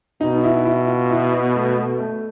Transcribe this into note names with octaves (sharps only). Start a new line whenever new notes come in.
B2 D#4
E4
E4
F4
E4
B3
A3
A3
A3